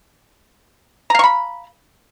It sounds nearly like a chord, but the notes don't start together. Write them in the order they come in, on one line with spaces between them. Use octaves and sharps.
A#5 F5 C#6 B5